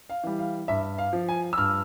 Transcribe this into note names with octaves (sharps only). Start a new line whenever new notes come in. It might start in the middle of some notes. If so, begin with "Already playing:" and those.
F5
E3 G3
F5
G2 E5
F5
F3
G#5
E6
G2 F6